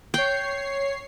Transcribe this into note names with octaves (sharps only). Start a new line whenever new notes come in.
C#5 G5 C7